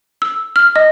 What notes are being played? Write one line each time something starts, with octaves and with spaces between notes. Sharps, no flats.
E6
F6
D#5